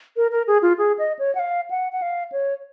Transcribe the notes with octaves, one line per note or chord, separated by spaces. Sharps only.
A#4
A#4
G#4
F4
G#4
D#5
C#5
F#5
F5
F#5
F#5
F5
C#5